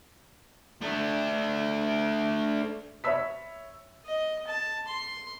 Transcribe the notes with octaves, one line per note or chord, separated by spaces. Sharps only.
A3 D4
C#5 E5 B5 E6 B6
D#5
A5
C6